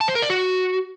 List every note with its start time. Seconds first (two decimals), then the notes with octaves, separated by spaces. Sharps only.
0.01 A5
0.08 C5
0.15 A#4
0.22 D5
0.30 F#4